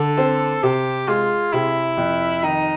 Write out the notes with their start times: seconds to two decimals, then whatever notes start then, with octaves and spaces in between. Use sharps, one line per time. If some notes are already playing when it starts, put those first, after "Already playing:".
Already playing: D3 A4
0.17 C4
0.63 C3 G4
1.08 G#3 F4
1.53 C3 E4
1.97 F2
2.43 D#3 D#4